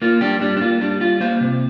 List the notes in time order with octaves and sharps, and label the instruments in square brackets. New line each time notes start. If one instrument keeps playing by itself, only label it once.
[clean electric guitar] A#3 F4
G3 D4 G4
G3 D4
D4
A#3 F4
G3 D4
G3 F4
A#3 C5 F5
C3